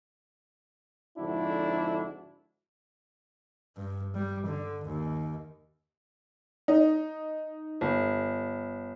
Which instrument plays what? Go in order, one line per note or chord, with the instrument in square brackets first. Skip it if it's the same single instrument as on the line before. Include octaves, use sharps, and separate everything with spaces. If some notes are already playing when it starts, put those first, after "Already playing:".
[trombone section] F2 G#2 D3 D4 E4 F#4
[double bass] G2
G3
D3
D#2
[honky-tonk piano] D#4
G1